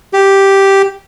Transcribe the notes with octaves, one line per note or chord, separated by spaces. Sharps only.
G4